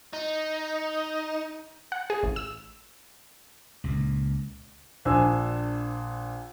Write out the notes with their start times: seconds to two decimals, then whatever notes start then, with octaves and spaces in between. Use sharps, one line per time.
0.13 D#4
1.92 F#5
2.10 G#4
2.23 A1
2.36 E6
3.84 C#2 A#2
5.05 A#1 D4 C5 G#5 E6